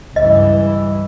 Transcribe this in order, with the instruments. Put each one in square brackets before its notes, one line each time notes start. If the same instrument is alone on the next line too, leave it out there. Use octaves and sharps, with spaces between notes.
[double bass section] C#2 G2 E3 [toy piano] D#5